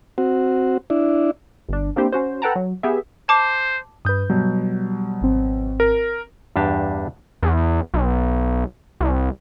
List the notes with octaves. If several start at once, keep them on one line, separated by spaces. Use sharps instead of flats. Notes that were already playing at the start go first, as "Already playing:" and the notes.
C4 F#4
D4 E4
G1 D4
A#3 C4 D4 E4 G4 C5
C#4 F#4 C5
A4 B4 F#5 G5 A5 A#5
F#3
B3 G4 G#4 E5
C5 A5 D6
G2 B4 D#6 G6
B2 F#3 G3
G#1 C4
A#4
E2 G2 D4 G4 A5
E2
B1
C2